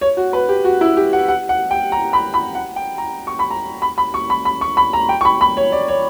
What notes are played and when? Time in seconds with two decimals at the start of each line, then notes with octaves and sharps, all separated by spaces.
0.01 C#5
0.17 F#4
0.33 B4
0.49 G4
0.65 F#4
0.81 E4
0.97 G4
1.13 F#5
1.28 F#5
1.49 F#5
1.71 G5
1.92 A#5
2.13 B5
2.34 B5
2.55 F#5
2.76 G5
2.98 A#5
3.27 C#6
3.39 B5
3.51 A#5
3.82 B5
3.98 B5
4.14 C#6
4.30 B5
4.45 B5
4.61 C#6
4.77 B5
4.93 A#5
5.09 G5
5.21 C#6
5.25 B5
5.41 B5
5.57 C#5
5.72 D5
5.88 C#5